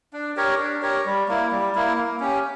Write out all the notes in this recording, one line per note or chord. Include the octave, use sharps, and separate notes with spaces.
D4
G4 A#4 C#5
D4
G4 A#4 C#5
G3
A#3 E4
G3
A#3 E4
A#3
C#4 G4